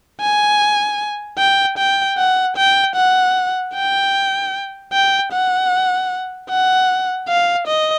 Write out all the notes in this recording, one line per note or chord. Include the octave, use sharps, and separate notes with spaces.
G#5
G5
G5
F#5
G5
F#5
G5
G5
F#5
F#5
F5
D#5